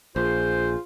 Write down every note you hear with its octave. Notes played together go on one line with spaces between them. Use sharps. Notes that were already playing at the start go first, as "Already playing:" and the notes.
A#1 F4 G#4 C5